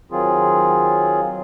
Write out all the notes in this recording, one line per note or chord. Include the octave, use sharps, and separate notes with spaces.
D#3 F#3 C4 F4 G#4